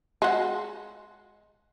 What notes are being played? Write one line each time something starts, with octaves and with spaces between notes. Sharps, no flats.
G#3 F#4